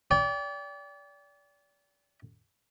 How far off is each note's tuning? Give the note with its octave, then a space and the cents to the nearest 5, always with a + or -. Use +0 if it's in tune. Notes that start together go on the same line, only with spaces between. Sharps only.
D5 -35 G5 +15